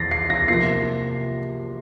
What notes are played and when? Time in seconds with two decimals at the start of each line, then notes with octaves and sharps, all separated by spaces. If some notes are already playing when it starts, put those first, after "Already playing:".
Already playing: E2 E3 A6 A#6 C7
0.11 C7
0.30 A#6
0.48 C3 F3 A#3 C7